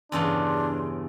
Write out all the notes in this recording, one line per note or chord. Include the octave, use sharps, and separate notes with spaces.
E2 G2 C#3 D4 C6